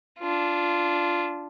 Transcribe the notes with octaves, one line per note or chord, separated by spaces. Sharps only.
D4 F4